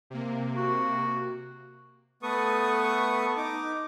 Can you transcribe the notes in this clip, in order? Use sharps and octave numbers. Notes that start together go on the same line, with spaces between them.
C3 A#3
F#4
A3 B3 A4 B4 C#6 D#6
D#4 D6